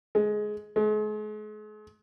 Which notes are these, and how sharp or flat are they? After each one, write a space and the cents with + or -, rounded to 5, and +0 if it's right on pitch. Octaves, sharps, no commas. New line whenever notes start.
G#3 +15
G#3 +40